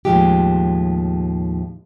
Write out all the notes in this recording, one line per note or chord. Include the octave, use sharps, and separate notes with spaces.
D#2 A2 C#3 F3 G#3 G4